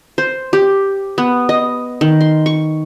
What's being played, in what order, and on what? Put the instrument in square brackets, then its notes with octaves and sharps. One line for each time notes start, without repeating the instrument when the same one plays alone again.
[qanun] C5
G4
B3
D#5
D#3
C6
C#6